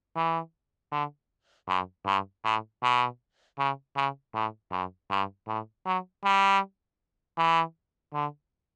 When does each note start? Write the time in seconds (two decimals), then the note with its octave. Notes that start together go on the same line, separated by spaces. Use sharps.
0.16 E3
0.92 D3
1.68 F#2
2.06 G2
2.44 A2
2.83 B2
3.58 C#3
3.96 C#3
4.34 A2
4.72 F#2
5.11 G2
5.48 A2
5.86 F#3
6.25 G3
7.38 E3
8.14 D3